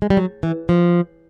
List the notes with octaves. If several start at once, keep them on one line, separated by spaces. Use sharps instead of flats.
G#3
G3
F#3
E3
F3